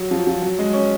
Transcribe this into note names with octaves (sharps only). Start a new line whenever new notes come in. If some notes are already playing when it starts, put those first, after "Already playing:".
Already playing: F#3
F3
F3
F#3
G#3
C#4